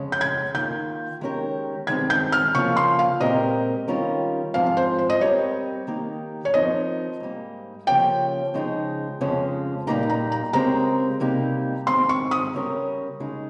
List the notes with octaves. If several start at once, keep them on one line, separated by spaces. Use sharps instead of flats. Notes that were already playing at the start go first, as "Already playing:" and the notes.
Already playing: F2 C#3 G#3 C#4
G6
G#6
D#3 A#3 F4 G6
D#3 G#3 C#4 G4 A#4
G2 D#3 G#3 C4 G#6
G6
F6
C#3 F3 A#3 F4 C#6
C6
F5
A#2 G#3 C4 G4 A#4 D#5
D#3 G3 C#4 F4 A#4
G#2 F3 C4 F4 F5
C5
C5
D#5
G3 C4 G4 A#4 C#5
D#3 A#3 D#4 G4
C#5
F3 C4 D#4 A#4 D#5
G#2 G3 A#3
C#3 F3 A#3 C#4 G4 G5
C#3 F3 G#3 D#4 G#4
F2 C#3 F3 G#3 C#4
A#2 G3 A#3 D#4 G4 A#5
A#5
A#5
C#3 G#3 C4 G4 A#4 A#5
C3 G3 A#3 D#4 G4
G#2 D#3 G#3 C4 C6
C#6
D#6
C#3 G3 C#4 G4 A#4
C#3 G#3 D#4 G#4